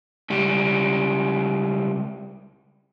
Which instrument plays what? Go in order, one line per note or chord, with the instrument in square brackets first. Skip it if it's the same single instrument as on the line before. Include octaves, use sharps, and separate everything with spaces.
[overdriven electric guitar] C#2 G3